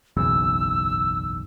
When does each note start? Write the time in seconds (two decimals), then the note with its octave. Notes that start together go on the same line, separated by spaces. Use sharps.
0.17 F#1 B1 E2 E6